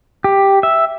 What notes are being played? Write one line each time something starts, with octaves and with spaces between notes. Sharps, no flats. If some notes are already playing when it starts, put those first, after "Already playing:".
G4
E5